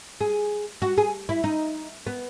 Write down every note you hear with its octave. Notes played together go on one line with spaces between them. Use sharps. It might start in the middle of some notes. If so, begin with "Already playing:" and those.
G#4
F#4
G#4
E4
D#4
B3